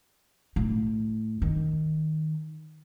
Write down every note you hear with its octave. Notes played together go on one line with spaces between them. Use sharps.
A2
D#3